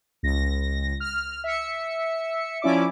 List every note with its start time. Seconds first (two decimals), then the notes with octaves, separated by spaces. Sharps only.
0.23 C#2 A#6
1.00 F6
1.44 E5 C#7
2.62 F3 C#4 E4 D5 D6